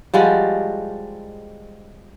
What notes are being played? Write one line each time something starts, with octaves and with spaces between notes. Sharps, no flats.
F3 G3 G#3 F#4